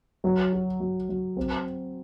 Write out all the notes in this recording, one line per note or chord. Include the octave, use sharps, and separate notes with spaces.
F#3
F#4
F#3
F#3
C4